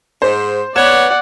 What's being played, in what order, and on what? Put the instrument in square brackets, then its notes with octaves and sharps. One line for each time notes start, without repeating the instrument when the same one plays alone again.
[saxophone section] G#2 [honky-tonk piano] C5
[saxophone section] B3 C#5 [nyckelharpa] D5 F#5 [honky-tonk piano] G#6 E7